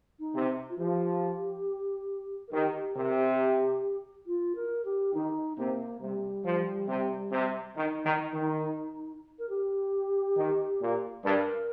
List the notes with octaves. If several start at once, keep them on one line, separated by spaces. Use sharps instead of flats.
D#4
C3
F4
F3 G4
A#4
D#3 G4
G4
C3 A#4
G4
F4
A#4
G4
D#3 D#4
C3 A#3
C3 G3
F3
C3
C3
D#3 D#4
D#3
D#3
A#4
G4
D#3
A#2
G2 A#4